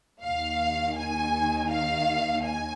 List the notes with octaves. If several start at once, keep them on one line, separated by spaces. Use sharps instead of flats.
D#2 D#3 F5
G#5
F5
G#5